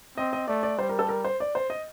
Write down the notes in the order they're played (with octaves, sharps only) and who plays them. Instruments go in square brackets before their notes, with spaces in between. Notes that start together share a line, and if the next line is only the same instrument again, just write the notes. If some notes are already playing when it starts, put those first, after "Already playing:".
[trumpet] C4 [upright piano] D#5
[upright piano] D#5
[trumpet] A3 [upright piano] D5
[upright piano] D5
[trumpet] G3 [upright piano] C5
[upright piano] A#4
A4
A#4
C5
D5
C5
D#5